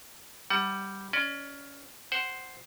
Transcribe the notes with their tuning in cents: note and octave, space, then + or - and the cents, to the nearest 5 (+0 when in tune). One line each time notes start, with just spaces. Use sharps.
G3 -5 F#5 +25
C#4 +20 D5 +40
C5 +0 F#5 +15